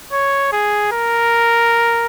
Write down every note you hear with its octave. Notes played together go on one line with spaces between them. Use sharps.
C#5
G#4
A#4